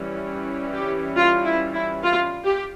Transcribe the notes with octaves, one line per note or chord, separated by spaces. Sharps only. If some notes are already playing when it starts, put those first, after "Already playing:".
Already playing: E3 G3 C#4
G4
F4
E4
E4
F4
G4